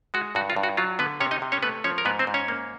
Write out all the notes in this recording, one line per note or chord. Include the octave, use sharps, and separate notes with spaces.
G#3 F#4
G2 F#4
F4
G2
F#4
F#3 F4
D3 B3 B4
C3 C#4 C#5
D#4 D#5
C3
C#4 C#5
A3 B3 B4
F3 C#4 C#5
A#4
G#2 B3 B4
C4 C5
G#2
C#4 C#5
A#3